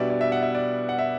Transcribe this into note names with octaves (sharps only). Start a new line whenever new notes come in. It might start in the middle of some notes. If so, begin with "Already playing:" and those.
Already playing: B2 G3 B3 D4 D5 E5
D5
E5
F#5
E5
D5
F#5
E5